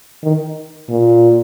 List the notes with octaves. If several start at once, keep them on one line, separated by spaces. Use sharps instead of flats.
D#3
A#2